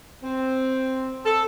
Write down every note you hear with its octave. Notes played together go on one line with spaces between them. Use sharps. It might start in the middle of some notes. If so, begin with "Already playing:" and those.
C4
A4